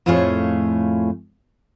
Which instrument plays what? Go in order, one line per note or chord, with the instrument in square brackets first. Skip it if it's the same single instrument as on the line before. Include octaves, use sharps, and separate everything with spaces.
[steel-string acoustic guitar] F2 A2 A3 F4 G#4 C#5